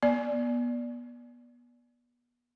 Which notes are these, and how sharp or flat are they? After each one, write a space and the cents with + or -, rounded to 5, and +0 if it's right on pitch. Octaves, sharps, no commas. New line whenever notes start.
B3 -30 D5 +0